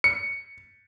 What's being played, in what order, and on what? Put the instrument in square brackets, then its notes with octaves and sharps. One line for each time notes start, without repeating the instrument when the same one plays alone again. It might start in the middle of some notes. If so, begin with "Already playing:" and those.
[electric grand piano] C#7